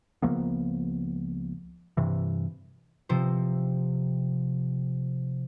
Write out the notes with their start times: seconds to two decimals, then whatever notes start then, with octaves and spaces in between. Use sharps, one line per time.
0.22 C#2 F3 A#3 B3
1.97 G2 C3 E3
3.09 C3 F3 C5